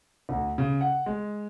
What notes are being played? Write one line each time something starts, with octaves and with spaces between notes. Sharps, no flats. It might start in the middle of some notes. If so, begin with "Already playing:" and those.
D2
C#3
F#5
G#3